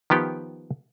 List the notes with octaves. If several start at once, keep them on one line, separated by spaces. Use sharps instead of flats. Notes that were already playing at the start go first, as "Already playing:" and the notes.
D#3 F3 B3 G4